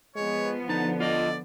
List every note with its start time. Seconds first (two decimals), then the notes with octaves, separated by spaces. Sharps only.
0.16 F3 G#3 B3 C#5
0.69 D3 D#4 A5
1.00 F4 D5 D#5